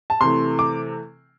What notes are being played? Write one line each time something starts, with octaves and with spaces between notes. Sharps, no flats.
A5
C3 E3 A3 C6
D6